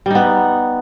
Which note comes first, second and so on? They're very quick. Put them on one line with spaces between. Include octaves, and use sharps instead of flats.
G3 D#4 B3